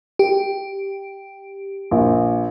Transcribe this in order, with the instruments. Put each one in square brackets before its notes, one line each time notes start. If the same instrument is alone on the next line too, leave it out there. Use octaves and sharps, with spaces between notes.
[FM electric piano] G4
[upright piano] A#1